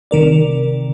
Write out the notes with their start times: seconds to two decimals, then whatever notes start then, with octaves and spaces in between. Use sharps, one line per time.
0.11 C3 D#3 A#4 D5